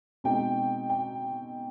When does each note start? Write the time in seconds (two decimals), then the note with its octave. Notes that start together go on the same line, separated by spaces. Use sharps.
0.24 B2 G#3 C4 D#4 G5
0.90 G5